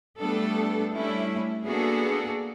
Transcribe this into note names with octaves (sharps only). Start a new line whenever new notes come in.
G3 A3 B3 D4 A4
G3 A3 C#4 D4 E4
A#3 B3 D4 F#4 G#4 A4